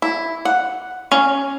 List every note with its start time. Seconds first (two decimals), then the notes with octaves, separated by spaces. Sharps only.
0.02 E4
0.45 F#5
1.12 C#4